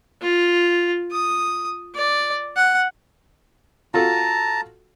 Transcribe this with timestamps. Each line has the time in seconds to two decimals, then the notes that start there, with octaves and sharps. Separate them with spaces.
0.21 F4
1.11 D#6
1.94 D5
2.56 F#5
3.94 F4 F#4 A4 A5 A#5